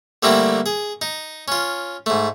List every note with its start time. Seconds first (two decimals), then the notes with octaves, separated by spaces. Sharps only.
0.23 D3 G3 A3 A#3 C4 E4
0.66 G#4
1.02 D#4
1.48 C#4 F4
2.06 G#2 A3